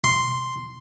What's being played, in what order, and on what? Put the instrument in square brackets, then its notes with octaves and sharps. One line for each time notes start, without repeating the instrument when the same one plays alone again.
[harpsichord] C6